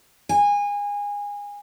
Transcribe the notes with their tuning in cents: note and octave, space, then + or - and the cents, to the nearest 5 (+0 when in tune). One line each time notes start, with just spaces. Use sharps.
G#5 -25